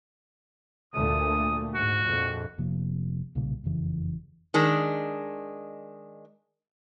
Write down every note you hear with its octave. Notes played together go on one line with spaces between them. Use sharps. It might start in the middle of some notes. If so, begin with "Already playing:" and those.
D2 A#2 A3 D#6
G#2 F#4
A#1 F2
F1 C3 F3 A#3
B1 A#2 C#3 G3
F#1 F2 C#3 E3
D#3 G#3 D4